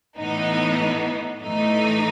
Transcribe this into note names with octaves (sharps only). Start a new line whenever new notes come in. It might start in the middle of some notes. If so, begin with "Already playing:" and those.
A2 E3 B3 D#4
A2 E3 A3 D#4